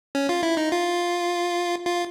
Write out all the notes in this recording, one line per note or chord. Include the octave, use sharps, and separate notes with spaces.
C#4
F4
E4
D#4
F4
F4